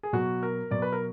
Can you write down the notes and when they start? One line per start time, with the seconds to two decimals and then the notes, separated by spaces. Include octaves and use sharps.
0.03 G#4
0.13 B2 F#3 F#4
0.43 A#4
0.71 B2 F#3 D5
0.82 B4
0.92 A#4